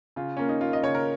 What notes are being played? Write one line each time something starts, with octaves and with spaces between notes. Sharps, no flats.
C#3 F4
A#3 C#4
D#4
A#3 F4
D#5
C#3 C#5
A#4